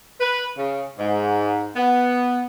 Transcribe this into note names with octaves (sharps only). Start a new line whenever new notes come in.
B4
C#3
G#2
B3